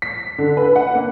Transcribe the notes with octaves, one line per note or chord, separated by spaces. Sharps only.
B6
D3
B4
F#5
A#3